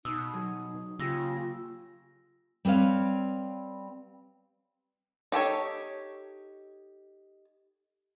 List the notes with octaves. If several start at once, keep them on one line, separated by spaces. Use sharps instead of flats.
B2 D#4 D#6 E6
F#3 G#4
C#3 A#3 F4 G4 E6 A#6
G3 C4 B4 C#5 F5
D#4 G4 A4 C#5